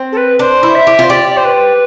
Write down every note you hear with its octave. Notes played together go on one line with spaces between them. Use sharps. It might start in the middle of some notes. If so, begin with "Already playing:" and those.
Already playing: C4
A4
B4
D4 C5
E4
E5
G4
F4 C5
G4 D5
D5
C5
B4